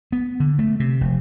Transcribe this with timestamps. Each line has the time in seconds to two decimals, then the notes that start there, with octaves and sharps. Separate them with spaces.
0.12 B3
0.40 D3
0.59 A3
0.80 C3
1.01 F1